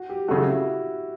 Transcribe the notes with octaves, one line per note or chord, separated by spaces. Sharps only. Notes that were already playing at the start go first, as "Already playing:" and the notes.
Already playing: F#4
G4
C#3 F#3 A3 F#4
E4